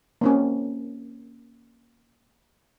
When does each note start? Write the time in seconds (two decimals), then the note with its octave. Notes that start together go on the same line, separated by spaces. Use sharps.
0.21 A#3 C4 C#4